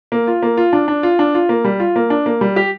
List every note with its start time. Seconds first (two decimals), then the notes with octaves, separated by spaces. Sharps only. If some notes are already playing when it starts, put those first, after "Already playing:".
0.12 A#3
0.27 F4
0.43 A#3
0.57 F4
0.73 D4
0.88 D4
1.03 F4
1.19 D4
1.35 F4
1.49 A#3
1.64 G3
1.80 F4
1.96 A#3
2.10 D4
2.26 A#3
2.41 G3
2.56 G4